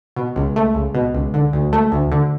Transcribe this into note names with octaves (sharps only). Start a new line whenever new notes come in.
B2
C#2
A3
C#2
B2
C#2
D3
D2
A3
D2
D3